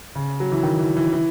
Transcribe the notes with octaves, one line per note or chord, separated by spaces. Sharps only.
C#3
F#3
E3
D#3
E3
E3
E3